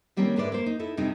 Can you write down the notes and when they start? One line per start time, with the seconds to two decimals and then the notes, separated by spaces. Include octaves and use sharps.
0.17 D#3 G3 A#3 C4 C#4
0.36 G#2 G#3 A#4 B4 D5 E5
0.52 A#3 C5
0.66 D#4
0.79 D#4 E4 A4
0.97 G2 C3 G3 C4 D#4